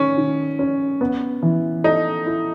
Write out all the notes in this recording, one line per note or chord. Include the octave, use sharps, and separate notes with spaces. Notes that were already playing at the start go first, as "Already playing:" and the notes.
Already playing: D#3 C#4
D#3
C#4
B3
E3
D#4 A4
E4